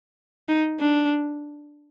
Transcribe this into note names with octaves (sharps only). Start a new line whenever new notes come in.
D#4
D4